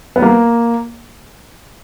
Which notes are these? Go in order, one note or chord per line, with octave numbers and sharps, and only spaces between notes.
B3
A#3